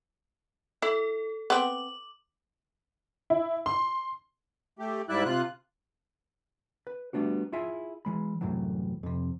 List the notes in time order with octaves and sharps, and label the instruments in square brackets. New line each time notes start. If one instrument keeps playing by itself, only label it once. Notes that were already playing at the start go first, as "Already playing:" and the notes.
[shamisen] E4 [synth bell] A4
[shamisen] B3 C4 [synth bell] D6 F#7
[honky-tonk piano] E4
C6
[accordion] A3 G4
G#2 G3 E4 D5 E5 F#6
C3 F4 F#6
[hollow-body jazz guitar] B4
G3 A3 B3 D4 F#4
E4 F4 G#4 E5 G#5
E3 G#3 B5
C2 F#2 A2 E3 F#3
F2 C3